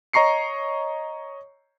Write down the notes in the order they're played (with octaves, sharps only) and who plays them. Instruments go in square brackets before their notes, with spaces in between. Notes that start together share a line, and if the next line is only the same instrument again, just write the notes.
[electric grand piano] C#5 D#5 A#5 C#6 C7 C#7